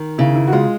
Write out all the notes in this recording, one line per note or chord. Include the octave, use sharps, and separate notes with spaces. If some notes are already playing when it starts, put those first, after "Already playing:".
Already playing: D#3
C#3 E4
E4
F#4
G#3 F4